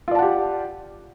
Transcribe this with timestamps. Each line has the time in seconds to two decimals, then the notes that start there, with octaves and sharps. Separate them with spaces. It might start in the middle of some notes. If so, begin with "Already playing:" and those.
0.08 F4
0.11 D5
0.15 A5
0.19 F#5
0.22 G4